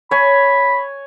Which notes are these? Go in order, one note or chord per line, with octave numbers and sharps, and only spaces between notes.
C#5 G#5 B5